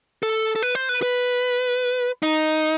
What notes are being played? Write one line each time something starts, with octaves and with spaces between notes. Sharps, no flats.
A4
A4
B4
C5
B4
B4
D#4